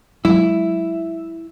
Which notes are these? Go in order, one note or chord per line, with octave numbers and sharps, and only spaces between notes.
F#3 G#3 E4